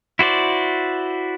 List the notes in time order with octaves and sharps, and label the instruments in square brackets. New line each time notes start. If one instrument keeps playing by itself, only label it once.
[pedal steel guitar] E4 F#4 C5 D5